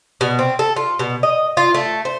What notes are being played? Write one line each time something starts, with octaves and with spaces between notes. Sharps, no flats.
B2
C4
A4
F4
B2
D#5
F4
A3
C5